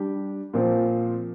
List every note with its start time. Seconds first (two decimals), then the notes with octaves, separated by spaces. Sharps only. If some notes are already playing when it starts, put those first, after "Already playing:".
Already playing: G3 D4 G4
0.53 A#2 F3 C4